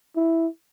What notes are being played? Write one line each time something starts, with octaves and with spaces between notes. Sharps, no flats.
E4